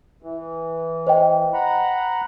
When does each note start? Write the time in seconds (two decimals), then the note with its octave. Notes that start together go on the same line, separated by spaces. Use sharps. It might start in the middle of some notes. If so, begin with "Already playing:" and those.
0.23 E3
1.07 C5 D#5 G5
1.54 F#5 A#5 B5